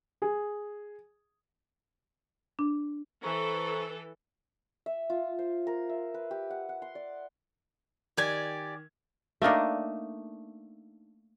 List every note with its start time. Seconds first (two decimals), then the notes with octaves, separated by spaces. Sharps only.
0.22 G#4
2.59 D4
3.23 E3 A4 C5 A#5 C#6
4.86 E5
5.10 F4
5.39 C5
5.67 A#4
5.89 E5
6.14 B4
6.31 G4
6.50 F#5
6.69 F#5
6.82 C6
6.95 D5
8.17 D#3 G4 D5 G#5 G#6
9.42 A3 A#3 D4 D#4